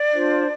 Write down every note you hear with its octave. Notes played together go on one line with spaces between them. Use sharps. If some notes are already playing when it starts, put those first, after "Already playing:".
Already playing: D5
D4 F4 C5